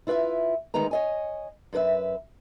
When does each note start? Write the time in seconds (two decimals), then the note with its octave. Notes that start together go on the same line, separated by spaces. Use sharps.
0.07 E4 F4 B4 D5 E5
0.74 D2 D#3 G#3 D#4 B4 A#5
0.91 C#5 D#5 G#5
1.73 F#2 E4 A#4 B4 E5